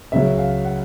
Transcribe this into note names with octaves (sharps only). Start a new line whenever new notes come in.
C#2 C#3 F#3 E5
F5
F#5